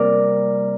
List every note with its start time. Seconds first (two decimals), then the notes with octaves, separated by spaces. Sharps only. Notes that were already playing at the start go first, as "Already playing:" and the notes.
Already playing: C3 G3 A#3 A#4 D5